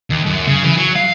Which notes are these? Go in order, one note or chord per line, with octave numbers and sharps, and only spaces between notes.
D#2
F#2
C#3
E3
F#3
F5